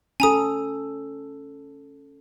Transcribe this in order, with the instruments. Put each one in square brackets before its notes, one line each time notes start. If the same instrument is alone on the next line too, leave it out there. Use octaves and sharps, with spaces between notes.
[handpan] C#4 A4 [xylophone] G#5 A#5 D#6